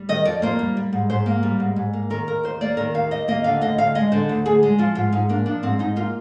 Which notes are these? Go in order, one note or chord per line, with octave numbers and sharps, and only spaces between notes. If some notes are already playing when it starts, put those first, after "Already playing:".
Already playing: G3
D#3 D#5
F2 D5
A#3 C5
G3
G3
G#2
G#2 C5
A#3
G3
G#2
G#2
A#3
D#3 A#4
D#2 A#4
D#2 C5
A#3 D5
D#3 A#4
D#2 F5
D#2 D#5
A#3 D#5
D3 F5
D2 D#5
D2 F5
G#3 D#5
D3 C5
D2
D2 G#4
G#3
F3 F4
G#2 F4
G#2 D#4
A#3 D4
F3 D4
G#2 C4
G#2 D#4
A#3 F4